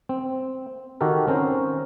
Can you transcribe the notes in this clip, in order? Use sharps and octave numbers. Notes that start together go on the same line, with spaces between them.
C4
D#3 F#4 G4 A4 A#4
C4 C#4 A#4 C5